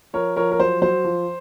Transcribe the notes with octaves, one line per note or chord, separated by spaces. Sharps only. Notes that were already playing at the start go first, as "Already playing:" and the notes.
F3 A#4 C#5
F3 A#4 C#5
A#4
F#3 C5
F#3 C5
F3